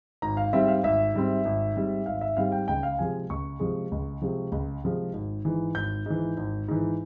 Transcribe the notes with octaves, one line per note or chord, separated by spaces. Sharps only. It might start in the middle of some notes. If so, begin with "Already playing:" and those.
G#1 A#5
F5
G#2 G3 C4 E5
F5
G#1 E5
G#2 G3 C4
G#1
G#2 G3 C4
G#1 F5
E5
G#2 G3 C4 F5
G5
C#2 G5
F5
C3 F3 G#3 G#5
C#2 C#6
C3 F3 G#3
C#2
C3 F3 G#3
C#2
C3 F3 G#3
G#1
G#2 E3
G#1 G6
G#2 E3
G#1
G#2 E3